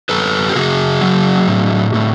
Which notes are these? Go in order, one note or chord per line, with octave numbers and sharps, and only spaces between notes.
F#2 A4 B4
G4
C#3 F#4 G#4
F#3
A2
A2